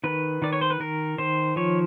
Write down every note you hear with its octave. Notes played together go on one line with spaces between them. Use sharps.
D#3 B4
D#3 D5
C#5
C5
B4
D#3 A#4
D#3 C5
F3 C#5